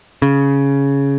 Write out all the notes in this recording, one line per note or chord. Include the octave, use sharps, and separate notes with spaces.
C#3